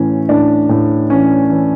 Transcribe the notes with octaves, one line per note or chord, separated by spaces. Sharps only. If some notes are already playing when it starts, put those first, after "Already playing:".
Already playing: A2 E3 C#4
A2 D4
A2
E3 C#4
E3